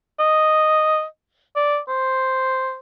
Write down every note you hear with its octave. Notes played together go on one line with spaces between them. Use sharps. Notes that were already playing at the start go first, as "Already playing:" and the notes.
D#5
D5
C5